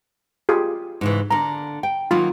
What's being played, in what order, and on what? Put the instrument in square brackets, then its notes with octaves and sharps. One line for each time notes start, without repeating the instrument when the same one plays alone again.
[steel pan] F4 G4 G#4
[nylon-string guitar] G#2 C#3 E3
[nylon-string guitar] D3 A#3 [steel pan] A#5
[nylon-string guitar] G5
[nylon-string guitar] D#3 F#3 A#3 [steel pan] F4